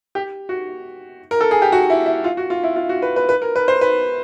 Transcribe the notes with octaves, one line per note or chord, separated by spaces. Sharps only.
G4
F#4
A#4
A4
G#4
G4
F#4
E4
E4
F4
F#4
F4
E4
F4
F#4
B4
B4
B4
A#4
B4
C5
B4